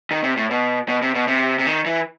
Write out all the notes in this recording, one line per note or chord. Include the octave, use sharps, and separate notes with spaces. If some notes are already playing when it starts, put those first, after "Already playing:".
D#3
C3
A2
B2
B2
C3
B2
C3
C3
D#3
E3